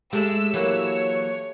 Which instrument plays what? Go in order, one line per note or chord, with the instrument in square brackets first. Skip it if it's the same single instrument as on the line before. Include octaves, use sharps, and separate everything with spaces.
[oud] G#3 [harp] G4 A4 E5 [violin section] E6
[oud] E3 F#3 A#3 [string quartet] C#5